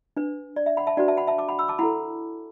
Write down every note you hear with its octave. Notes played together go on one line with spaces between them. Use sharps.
D4 B4
D5
E5
F#5 B5
E5 A5
D4 F#4 B4 D5 F#5
E5 A5
F#5 B5
E5 A5
A5 D6
F#5 B5
B5 E6
A5 D6
E4 A4 F#5 B5